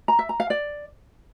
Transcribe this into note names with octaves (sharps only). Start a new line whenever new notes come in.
A#5
E5
A#5
F5
D5